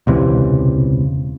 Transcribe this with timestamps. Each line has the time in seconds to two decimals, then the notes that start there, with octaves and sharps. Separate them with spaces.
0.07 E1 C#2 C3 E3